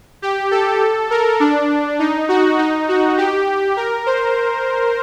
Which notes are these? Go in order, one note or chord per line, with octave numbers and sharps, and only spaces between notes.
G4
A4
A#4
D4
D#4
F#4
D#4
F#4
G4
A#4
C5